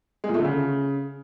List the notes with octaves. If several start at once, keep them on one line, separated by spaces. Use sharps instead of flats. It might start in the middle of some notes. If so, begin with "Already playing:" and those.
G#3
A#2
A3
D3
C#3